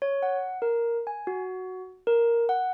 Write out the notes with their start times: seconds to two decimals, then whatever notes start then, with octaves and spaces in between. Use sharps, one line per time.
0.02 C#5
0.23 F#5
0.62 A#4
1.07 G#5
1.27 F#4
2.07 A#4
2.49 F#5